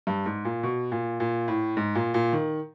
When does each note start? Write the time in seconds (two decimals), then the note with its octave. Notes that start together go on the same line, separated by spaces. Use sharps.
0.07 G2
0.26 G#2
0.45 A#2
0.63 B2
0.92 A#2
1.20 A#2
1.48 A2
1.77 G#2
1.95 A#2
2.14 A#2
2.33 D#3